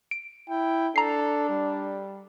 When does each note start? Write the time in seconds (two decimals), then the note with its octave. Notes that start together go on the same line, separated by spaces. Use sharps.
0.11 D7
0.49 E4 G5
0.96 D4 A4 A#5 C7
1.49 G3